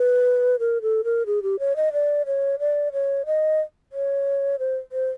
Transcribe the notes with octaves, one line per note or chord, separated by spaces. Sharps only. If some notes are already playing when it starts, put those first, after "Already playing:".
Already playing: B4
A#4
A4
A#4
G#4
G4
C#5
D#5
D5
C#5
D5
C#5
D#5
C#5
C5
C5